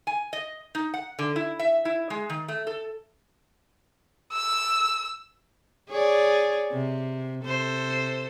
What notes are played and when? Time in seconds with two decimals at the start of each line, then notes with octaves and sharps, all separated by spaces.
0.07 G#5
0.33 D#5
0.75 D#4
0.94 F#5
1.19 D3
1.36 E4
1.59 E5
1.85 E4
2.10 G#3
2.30 D#3
2.48 A3
2.67 A4
4.33 E6
5.89 G#4 C#5 D5
6.72 C3
7.44 C3 A4 C5